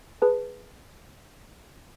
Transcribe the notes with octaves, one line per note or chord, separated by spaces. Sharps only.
G#4 B4 A5